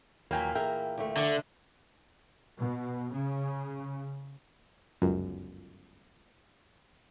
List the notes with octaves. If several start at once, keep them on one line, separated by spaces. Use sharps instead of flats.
D#2 A#2 E3 F#3 A#3 G5 G#5
G#4 A#4 E5 G5
D2 A3
D3
B2
C#3
G1 C#2 F#2